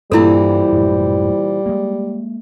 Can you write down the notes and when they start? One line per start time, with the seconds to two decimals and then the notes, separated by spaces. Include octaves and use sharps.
0.12 G2 A#2 E3 G3 C4 D4 E4 A4
0.72 F#2 A2 C3
1.66 G#3 A#3